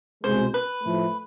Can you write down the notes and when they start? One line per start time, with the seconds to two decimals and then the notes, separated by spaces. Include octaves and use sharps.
0.24 C2 B2 G#3 C5
0.54 B4
0.83 A2 F3 A3